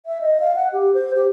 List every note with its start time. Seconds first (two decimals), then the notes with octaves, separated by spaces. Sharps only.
0.06 E5
0.21 D#5
0.40 F5
0.55 F#5
0.73 G4
0.94 C5
1.16 G4